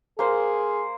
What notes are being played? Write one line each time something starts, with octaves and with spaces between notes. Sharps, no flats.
A#3 G#4 C5